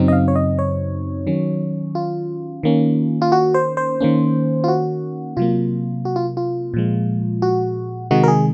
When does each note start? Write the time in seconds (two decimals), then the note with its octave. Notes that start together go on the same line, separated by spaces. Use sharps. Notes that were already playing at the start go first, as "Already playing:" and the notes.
Already playing: F#2 C#3 F#3 C4 D#4
0.08 D#5
0.12 F5
0.28 C#5
0.35 D#5
0.59 C#5
1.27 D#3 F#3 C#4
1.95 F4
2.63 D#3 A#3 C#4
3.22 F4
3.32 F#4
3.54 C5
3.77 C5
4.00 D#3 A#3 C#4
4.64 F4
4.68 F#4
5.37 C3 F#3 A#3 F4
6.05 F#4
6.16 F4
6.37 F4
6.74 A#2 F3 G#3
7.42 F#4
8.11 C3 D#3 G#3 D#4 F#4
8.23 A#4
8.28 G#4